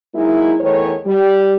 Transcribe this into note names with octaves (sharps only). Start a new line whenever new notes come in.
F#3 G#3 A#3 D#4 E4
E2 D#3 E3 A3 C#5
G3